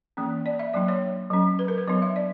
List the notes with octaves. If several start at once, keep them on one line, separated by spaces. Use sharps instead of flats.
E3 A#3 C#4
D5
E5
F#3 A#3 D4 D5
C#5
F#3 C#4
B4
A#4
B4
F#3 B3 D4 C#5
E5
D5